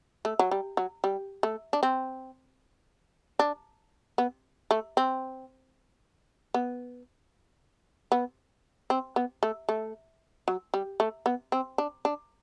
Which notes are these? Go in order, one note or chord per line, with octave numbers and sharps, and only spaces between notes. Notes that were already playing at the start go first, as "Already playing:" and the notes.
A3
F#3
G3
F#3
G3
A3
D4
C4
D4
B3
A3
C4
B3
B3
C4
B3
A3
A3
F#3
G3
A3
B3
C4
D4
D4